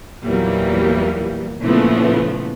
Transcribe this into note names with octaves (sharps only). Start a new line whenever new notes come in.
E2 A#2 E3 F#3 G3 A#3
A#2 C#3 E3 F3 A3 B3